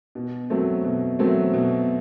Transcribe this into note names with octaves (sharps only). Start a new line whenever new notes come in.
B2
F#3 A3 C4
B2
F#3 A3 C4
B2